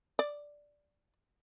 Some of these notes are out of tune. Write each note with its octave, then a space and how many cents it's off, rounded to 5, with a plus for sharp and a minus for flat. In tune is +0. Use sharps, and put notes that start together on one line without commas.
D5 -5